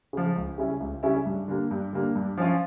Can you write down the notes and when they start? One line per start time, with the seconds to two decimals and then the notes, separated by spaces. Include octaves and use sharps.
0.13 C#3 F3
0.36 C#2
0.58 C#3 G3 C#4 E4
0.80 C#2
1.03 C#3 G3 C#4 E4
1.26 G2
1.48 D3 G3 A#3
1.71 G2
1.93 D3 G3 A#3
2.15 G2
2.37 F3 C#4 F4